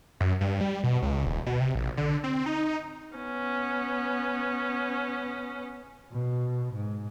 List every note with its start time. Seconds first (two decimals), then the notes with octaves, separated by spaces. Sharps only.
0.20 F#2
0.41 G2
0.61 G3
0.84 B2
1.02 C#2
1.26 D#1
1.46 B2
1.60 C3
1.75 A#1
1.97 D3
2.24 C4
2.46 D#4
3.15 B3 C#4
6.12 B2
6.74 G#2